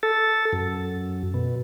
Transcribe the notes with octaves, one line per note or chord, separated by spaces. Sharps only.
A4
F#2
B2